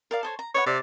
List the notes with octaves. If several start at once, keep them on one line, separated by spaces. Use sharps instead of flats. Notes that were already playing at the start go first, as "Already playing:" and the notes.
A#4 D5 F5
A4 C5 C#5
A#5
B4 C#5 D5 F#5
C3 D5